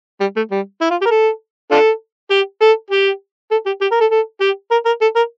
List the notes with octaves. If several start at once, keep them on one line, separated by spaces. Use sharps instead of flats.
G3
A3
G3
E4
F4
G4
A#4
A4
D4 F4 A4
G4
A4
G4
A4
G4
G4
A#4
A4
A4
G4
A#4
A#4
A4
A#4